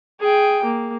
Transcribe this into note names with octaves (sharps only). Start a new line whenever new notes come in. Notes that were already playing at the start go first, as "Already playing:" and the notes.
G#4 G5
A#3